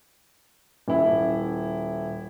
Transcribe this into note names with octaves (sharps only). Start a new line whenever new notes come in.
D#1 E4